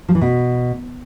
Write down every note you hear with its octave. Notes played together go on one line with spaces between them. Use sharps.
F3
E3
B2